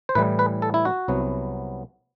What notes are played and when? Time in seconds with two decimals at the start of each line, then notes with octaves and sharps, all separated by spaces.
0.09 C5
0.15 A2 E3 G3 B4
0.39 B4
0.62 A4
0.74 E4
0.85 F#4
1.08 C2 C3 F#3 B3